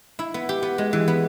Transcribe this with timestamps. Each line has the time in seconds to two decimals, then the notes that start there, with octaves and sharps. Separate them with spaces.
0.19 E4
0.34 B3
0.49 G4
0.63 B3
0.78 G#3
0.93 E3
1.08 B3